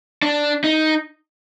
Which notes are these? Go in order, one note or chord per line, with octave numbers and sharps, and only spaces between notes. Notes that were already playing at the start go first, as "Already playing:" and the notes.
D4
D#4